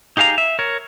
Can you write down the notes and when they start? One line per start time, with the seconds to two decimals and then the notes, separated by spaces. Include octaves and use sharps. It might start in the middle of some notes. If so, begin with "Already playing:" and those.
0.17 D#4 G4 G#4 F5 A#5
0.38 E5
0.59 A#4 C#5